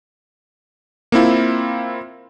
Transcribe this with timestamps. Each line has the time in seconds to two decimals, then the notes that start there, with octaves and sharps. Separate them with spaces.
1.12 A#3 C4 E4 F4